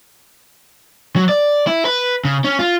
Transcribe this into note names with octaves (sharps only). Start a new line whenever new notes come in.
F#3
D5
E4
B4
C#3
C#4
F4